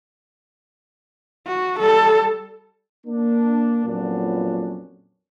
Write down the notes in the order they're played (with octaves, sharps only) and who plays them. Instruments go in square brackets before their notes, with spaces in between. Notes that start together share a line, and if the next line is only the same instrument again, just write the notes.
[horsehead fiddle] F#4
G3 A4
[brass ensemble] A#3 D4
F2 A#2 F#3 B3 C#4 D4